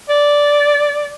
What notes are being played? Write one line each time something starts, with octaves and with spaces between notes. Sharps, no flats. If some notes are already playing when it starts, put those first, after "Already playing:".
D5